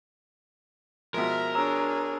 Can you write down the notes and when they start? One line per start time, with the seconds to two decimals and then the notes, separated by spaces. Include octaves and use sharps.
1.14 B2 F3 G#3 A#4 E5
1.55 D4 G#4 C#5 A#5 E6